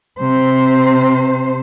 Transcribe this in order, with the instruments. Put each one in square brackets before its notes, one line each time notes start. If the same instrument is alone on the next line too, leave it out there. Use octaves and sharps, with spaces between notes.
[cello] C3 C5